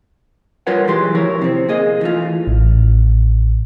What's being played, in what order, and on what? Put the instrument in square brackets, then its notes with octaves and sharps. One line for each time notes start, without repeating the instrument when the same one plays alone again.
[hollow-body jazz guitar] G3 F4 A#4 B4 C#5 F#5
B1 E3 G#3 G4 C6
D2 F3 E4 A#4 C#5
C3 C4
A#3 G#4 D#5
E3 A3 F4
[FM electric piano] A1